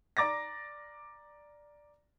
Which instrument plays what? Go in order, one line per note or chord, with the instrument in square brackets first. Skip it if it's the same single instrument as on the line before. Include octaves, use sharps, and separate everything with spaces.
[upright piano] D5 A#5 D6 A6 A#6